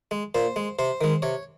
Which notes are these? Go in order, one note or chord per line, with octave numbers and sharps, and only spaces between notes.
G#3
A#2 C5
G#3
C3 C5
D#3 G#3
C3 C#5